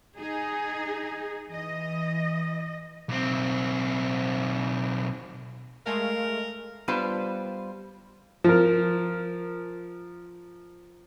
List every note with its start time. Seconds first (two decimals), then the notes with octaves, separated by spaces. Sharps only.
0.18 D#4 G#4
1.47 E3 D#5
3.09 B1 C4
5.86 G#3 A3 A#4 F5
6.88 G3 B3 D4 F4 B4 C5
8.44 F3 A#4